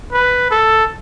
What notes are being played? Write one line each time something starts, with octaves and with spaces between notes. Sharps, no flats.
B4
A4